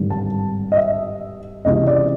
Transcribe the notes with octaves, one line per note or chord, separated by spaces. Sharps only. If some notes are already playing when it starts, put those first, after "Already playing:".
Already playing: G#1 G2 D3
A5
D#5
E5
C#2 C3 E3 D#5
D5